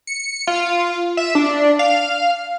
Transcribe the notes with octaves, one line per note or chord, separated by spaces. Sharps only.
C#7
F4
E5
D4
F5